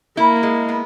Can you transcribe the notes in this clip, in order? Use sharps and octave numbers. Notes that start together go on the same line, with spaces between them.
A#3 E4
G#3
B3